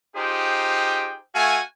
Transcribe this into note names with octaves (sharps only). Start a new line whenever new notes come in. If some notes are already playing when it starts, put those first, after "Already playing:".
D#4 F4 G4 G#4 C5 G5
A3 F#4 F5 G#5